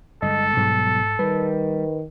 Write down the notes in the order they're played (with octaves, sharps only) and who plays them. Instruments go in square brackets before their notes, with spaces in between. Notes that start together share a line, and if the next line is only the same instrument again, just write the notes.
[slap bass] G2 D3 G#3 [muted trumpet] A4 [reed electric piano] D#5
[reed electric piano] G#2 [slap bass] B2 F#3 G3
[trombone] D#3 [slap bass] G3 [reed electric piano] B4